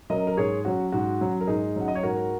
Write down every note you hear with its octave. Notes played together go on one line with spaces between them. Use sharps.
F#3 C#4 A#4 D#5
A#4
G#2 G#4 C#5
F#3 C#4 F#4
G#2 F#4
F#3 C#4
A#4
G#2 D#4 G#4
F#3 C#4 F#5
D#5
C#5
G#2 F#4 A#4